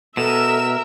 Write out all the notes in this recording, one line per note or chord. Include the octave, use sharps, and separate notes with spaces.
B2 A4 A#4 E5 E7